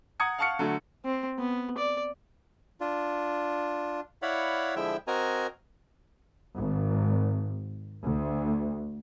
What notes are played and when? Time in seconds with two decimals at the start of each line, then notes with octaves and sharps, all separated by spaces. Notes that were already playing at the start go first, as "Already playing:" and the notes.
0.20 F#5 A#5 D#6 G#6 C#7
0.38 F5 F#5 A5 C#6 F6 C#7
0.59 D3 F#3 A3
1.05 C4
1.38 B3
1.78 D5
2.81 D4 F4
4.22 E4 C#5 D5 F5 F#5 B5
4.76 D3 F3 G#3 E4 E5 G5
5.07 C4 F#4 A#4 D#5 G#5 A#5
6.57 G#1
8.03 D2